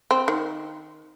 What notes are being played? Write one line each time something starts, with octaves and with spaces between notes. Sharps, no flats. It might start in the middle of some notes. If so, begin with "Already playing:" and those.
C4
D#3